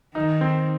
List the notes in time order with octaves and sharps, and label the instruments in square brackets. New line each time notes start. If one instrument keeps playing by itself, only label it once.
[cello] D#3 [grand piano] D#4
[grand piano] C4